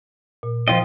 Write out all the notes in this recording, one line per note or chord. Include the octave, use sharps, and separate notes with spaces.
A#2
F3 F4 D#5 G5